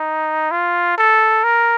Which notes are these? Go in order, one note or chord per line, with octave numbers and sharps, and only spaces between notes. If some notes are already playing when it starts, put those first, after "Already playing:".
Already playing: D#4
F4
A4
A#4